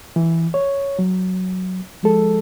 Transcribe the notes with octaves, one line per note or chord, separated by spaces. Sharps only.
E3
C#5
F#3
F3 G#3 A4